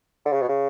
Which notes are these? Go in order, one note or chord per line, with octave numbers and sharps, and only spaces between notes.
D3
C#3
B2
C#3